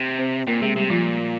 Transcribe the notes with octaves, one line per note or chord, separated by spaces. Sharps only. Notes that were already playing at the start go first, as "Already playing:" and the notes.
Already playing: C3
C4 C5
A#2 A#3 A#4
C3 G#3 G#4
C3 G3 G4
A#2 F3 F4